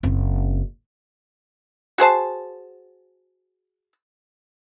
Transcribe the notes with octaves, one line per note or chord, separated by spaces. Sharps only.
F#1 C4
F#4 G#4 C5 A5